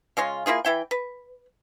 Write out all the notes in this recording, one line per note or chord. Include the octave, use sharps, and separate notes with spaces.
C#3 G#3 C#4 F4
A#3 E4 F4 G#4
E3 E4 G5
B4